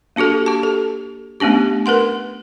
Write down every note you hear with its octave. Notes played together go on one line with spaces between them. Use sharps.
A#3 D4 F#4 G4 A4
G4 A5
A4
A3 B3 C#4 D4 G4
A#4 B4 F#5 C6